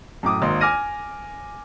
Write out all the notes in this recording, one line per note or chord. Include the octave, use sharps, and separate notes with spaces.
F#2 A2 D6 D#6
G#1 A#3 D#4 C6
G#5 D6 F6 A#6 D#7